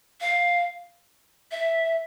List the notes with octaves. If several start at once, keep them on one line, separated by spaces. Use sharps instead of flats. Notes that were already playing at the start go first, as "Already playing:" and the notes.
F5
E5